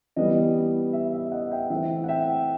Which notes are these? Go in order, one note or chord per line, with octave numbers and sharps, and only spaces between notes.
E3 G3 B3 D#5
E5
E5
D#5 F#5
E5 G5
E3 A3 C4 E5
F#5
E5 G5